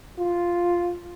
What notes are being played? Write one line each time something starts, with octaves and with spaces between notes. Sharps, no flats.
F4